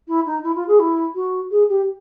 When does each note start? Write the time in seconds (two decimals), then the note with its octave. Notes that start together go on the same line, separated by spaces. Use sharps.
0.08 E4
0.26 D#4
0.43 E4
0.56 F4
0.68 G#4
0.80 E4
1.15 F#4
1.51 G#4
1.69 G4